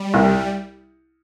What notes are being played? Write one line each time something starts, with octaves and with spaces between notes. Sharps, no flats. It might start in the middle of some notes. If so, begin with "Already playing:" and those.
Already playing: G3
C2